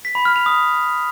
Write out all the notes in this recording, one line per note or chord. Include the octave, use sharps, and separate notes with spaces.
B6
B5
F6
F7
D#6